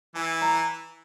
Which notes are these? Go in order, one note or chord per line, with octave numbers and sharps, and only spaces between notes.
E3 G#5
A#5